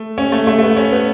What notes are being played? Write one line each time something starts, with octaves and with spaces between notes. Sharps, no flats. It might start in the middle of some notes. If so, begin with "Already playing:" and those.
Already playing: A3
C#4
A3
A3
A3
B3
C#4
B3